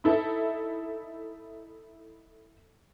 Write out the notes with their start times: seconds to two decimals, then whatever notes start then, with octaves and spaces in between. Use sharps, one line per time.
0.04 D#4 E4 A4